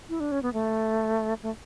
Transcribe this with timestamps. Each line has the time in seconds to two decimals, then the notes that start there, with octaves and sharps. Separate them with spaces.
0.09 E4
0.20 D4
0.32 C#4
0.43 B3
0.53 A3
1.43 A3